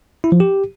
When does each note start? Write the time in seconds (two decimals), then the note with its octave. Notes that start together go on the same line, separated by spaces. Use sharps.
0.24 E4
0.32 F3
0.40 G4